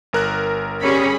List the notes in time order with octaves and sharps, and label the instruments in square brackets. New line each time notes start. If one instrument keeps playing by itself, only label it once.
[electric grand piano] G1 A#4 F#6
[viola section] G3 G#4 B5 [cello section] C#4